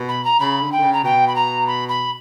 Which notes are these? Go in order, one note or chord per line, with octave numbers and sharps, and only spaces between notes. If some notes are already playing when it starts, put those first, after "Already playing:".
Already playing: B2
B5
A#5
C#3 B5
D3
G5
D3
C#3
A#5
B2 G5
B5
A#5
B5
B5